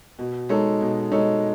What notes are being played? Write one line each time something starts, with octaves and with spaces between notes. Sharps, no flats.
B2
G#3 D#4 A4 C#5
B2
G#3 D#4 A4 C#5